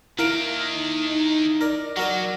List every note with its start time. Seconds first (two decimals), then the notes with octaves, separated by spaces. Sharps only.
0.19 D#3 A#3 E4 A#4 F5 A#5 D7
0.70 D#4
1.07 D#4
1.61 A#4 D5
1.97 F#3 F#4 A#4 D5